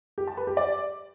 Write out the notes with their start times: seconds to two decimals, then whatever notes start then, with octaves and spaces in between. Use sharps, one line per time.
0.18 G4
0.27 A5
0.37 B4
0.47 G4
0.57 D5